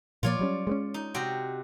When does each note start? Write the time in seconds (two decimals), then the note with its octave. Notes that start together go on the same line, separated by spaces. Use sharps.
0.23 A#2 F3 A#3 F4 C#5 D5
0.39 F#3 G3 C#4
0.67 G#3 B3 C#4
0.94 D#4
1.14 C3 F#4 G5